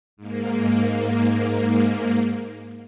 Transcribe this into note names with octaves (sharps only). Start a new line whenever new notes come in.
G#2 A#3